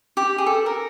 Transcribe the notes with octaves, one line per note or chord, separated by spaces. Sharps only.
G4
G#4
A4
A#4